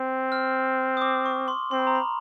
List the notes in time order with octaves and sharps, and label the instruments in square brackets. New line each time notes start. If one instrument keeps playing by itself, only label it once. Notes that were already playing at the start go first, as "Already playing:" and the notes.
Already playing: [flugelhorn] C4
[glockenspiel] F6
D#6
D6
C#6
C6
[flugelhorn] C4 [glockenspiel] C6
[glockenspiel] B5
A#5
B5